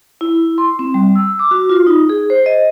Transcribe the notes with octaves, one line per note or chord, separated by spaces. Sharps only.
E4
C6
C4
G3
E6
D6
F#4
F4
D#4
G#4
C5
D#5